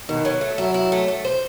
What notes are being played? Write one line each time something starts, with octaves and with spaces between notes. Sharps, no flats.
B2 D#3
F#3
A3
F#3 E4
E4
A3
A3
C5